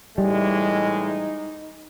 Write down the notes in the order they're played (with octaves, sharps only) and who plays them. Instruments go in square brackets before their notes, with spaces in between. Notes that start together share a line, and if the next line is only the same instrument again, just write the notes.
[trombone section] A2 E3 G#3 [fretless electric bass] G3 [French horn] D#4